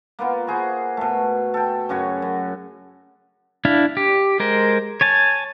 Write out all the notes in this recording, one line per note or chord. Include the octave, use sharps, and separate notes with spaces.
A#3 B3 F4
F#4 G#4 C5
B2 A3
A4 G5
F#2 C#3 F#4 C#5
F#2
D4 E4 F5
G4
G#3 A#4 C5
C#5 G#5 A5